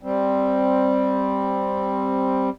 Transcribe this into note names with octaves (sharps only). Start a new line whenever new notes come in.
G3 C4